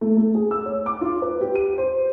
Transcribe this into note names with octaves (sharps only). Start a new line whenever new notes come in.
A3
A3
G#4
E6
C#5
D6
F4
B4
G4
D#7
C5